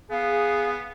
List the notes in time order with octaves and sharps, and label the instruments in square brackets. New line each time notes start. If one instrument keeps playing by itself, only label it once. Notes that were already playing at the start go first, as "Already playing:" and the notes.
[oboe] B3 [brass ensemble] G#4 [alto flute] F5